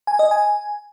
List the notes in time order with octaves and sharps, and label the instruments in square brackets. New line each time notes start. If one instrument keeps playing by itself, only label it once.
[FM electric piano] G#5
D#5
G#5